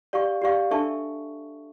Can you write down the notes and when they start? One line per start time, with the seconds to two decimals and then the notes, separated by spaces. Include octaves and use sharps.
0.13 G4 D5 F5 C#6
0.42 G4 D5 F5 C#6
0.71 D4 A4 E5 A5 C#6